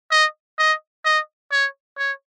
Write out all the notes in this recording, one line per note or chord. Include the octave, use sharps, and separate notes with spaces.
D#5
D#5
D#5
C#5
C#5